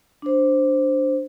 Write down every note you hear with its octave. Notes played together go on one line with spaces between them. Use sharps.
D4 C5